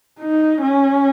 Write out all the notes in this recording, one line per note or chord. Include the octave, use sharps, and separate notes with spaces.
D#4
C#4